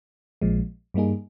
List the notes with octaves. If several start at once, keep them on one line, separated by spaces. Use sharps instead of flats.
A#1 A#2 F3 G#3
G2 G3 A#3 D#4 G#4